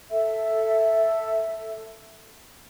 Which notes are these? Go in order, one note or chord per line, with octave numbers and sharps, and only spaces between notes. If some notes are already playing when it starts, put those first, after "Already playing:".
A4 E5